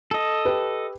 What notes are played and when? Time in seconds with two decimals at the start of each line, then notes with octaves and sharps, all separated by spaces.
0.11 A4 D#5
0.45 G4 B4